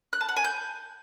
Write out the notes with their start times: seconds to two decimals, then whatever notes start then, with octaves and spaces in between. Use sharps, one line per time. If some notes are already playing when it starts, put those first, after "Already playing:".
0.13 F#6
0.21 A5
0.29 F#5
0.37 G#5
0.44 G6